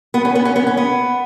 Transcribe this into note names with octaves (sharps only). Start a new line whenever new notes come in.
B3
C#4
B3
C#4
B3
C#4
B3